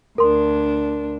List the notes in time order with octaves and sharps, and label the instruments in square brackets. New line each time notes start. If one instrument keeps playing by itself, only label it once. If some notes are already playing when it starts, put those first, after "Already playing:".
[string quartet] D2 D4 [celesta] A#4 C6